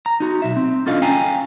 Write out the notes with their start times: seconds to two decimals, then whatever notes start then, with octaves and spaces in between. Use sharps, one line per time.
0.06 A#5
0.20 D#4 F#4
0.42 B1 E5
0.57 C4
0.86 C#4 D4 F4 A4 D#5 F5
1.02 C#4 F5 G5 G#5 A#5